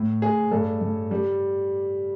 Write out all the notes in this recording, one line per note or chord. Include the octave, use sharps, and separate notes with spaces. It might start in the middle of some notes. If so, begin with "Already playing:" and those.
Already playing: A2
A2 G#4
G2 A4
G2
G3